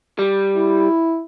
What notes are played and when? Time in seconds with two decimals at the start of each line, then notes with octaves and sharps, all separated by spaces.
0.19 G3
0.56 E4